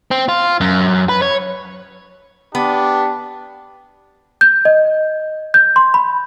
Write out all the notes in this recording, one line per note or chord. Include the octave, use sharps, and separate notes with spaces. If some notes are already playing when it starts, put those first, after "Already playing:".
C4
F4
F#2
B4
C#5
B3 D4 G4
G6
D#5
G6
C6
B5